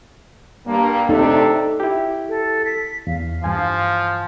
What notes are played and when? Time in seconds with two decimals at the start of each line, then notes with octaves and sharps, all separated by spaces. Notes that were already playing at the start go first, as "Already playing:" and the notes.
0.66 G2 A#3
1.09 C3 A3 D4 D#4 A4
1.80 E4 G4
2.29 A4
2.65 B6
3.07 E2 F5
3.44 G2 E3 F3 G#5